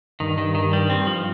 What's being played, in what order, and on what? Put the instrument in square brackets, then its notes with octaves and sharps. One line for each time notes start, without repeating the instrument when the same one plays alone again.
[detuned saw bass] G2 [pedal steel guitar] D#3
[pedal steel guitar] D#3
D#3
G3
C4
F3